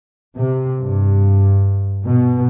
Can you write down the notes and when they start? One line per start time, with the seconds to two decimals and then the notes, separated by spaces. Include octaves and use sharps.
0.36 C3
0.81 G2
2.03 B2